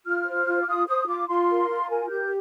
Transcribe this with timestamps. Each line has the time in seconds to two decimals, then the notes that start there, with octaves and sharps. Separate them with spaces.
0.05 F4 F6
0.26 C5
0.46 F4
0.62 D6
0.67 F4 D#6
0.87 C5 D#6
1.07 F4 D6
1.28 F4 C6
1.49 A#4
1.69 F4
1.82 A#5
1.89 A#4 G#5
2.10 G4 G6